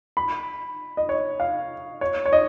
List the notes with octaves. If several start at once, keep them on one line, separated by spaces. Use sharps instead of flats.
B5
D#5
C#5
F5
C#5
C#5
D#5